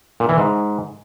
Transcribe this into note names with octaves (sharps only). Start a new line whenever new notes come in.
A#2
E3
G#2